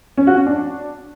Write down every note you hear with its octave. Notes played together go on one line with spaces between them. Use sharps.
C#4
F#4
C#4
D4